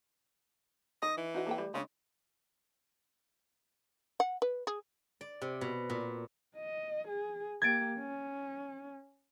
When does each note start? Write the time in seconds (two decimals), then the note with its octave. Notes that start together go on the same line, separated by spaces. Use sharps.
1.02 D#3 D#5
1.17 E3
1.34 D#4 F#4 D#5
1.47 A#3 A4 G5
1.58 G3 A3
1.74 C#3 G#3 C#4 D4
4.20 F#5
4.42 B4
4.67 G#4
5.21 D5
5.42 C3
5.61 B2
5.90 A#2
6.56 D#5
7.08 G#4
7.62 A#3 G4 G#6 A6 D7
7.99 C#4